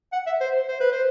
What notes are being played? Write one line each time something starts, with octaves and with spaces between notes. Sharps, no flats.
F#5
E5
C5
C5
B4
C5